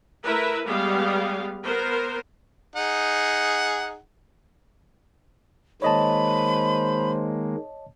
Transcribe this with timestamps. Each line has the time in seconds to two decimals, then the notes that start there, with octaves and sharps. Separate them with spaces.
0.23 A3 E4 A#4 B4 E5
0.65 G3 G#3 B3 F5
1.62 B3 A#4 C5
2.76 D#4 G#4 F#5
5.82 D#3 G#3 A#3 C5 C#5 D#5 A5 B5